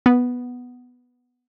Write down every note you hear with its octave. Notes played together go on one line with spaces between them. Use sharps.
B3